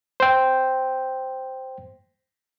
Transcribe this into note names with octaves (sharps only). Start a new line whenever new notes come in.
C5 G5